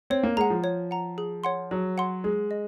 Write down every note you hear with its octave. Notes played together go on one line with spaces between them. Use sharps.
C4 C#5
A#3
G#3 F#5 A#5
F3
C#5
F#5 A#5
G#4
C#5 F#5 C6
F#3 G#4
C#5 F#5 C6
G#3 G#4
D#5